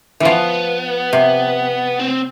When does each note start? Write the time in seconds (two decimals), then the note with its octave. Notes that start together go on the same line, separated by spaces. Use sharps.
0.20 E3 F3 B3
1.13 C3
1.99 C4